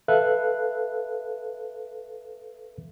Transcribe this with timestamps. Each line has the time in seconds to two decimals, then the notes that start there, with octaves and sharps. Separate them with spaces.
0.08 A4 B4 E5 F5 F#6